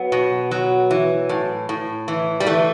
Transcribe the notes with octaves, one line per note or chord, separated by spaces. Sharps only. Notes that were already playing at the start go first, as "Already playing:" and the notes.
Already playing: F#3 B3
B2
F#3
E3
A2
A2
E3
G3
E3 A3